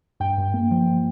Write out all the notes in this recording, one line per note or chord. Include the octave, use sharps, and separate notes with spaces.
G2 G5
G2
A#3
F3